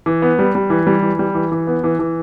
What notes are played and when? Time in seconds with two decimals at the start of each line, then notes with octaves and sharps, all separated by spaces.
0.06 E3
0.22 B3
0.39 G3
0.55 G3
0.70 E3
0.87 G3
1.02 E3
1.19 G3
1.35 E3
1.52 E3
1.67 B3
1.84 E3
1.99 E3